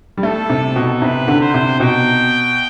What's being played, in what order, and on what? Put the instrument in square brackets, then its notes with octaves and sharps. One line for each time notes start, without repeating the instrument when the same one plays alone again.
[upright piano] G3
[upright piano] A3 [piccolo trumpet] A4
[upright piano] C3
B2
[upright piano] C3 [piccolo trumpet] B4
[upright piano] D3
[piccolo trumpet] C5
[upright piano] C3
[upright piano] B2 [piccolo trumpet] G5